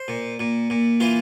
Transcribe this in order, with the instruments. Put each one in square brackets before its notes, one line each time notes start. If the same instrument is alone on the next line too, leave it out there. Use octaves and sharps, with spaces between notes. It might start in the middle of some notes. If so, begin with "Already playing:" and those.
Already playing: [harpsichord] C5
A#2
A#2
A#2
E3 F4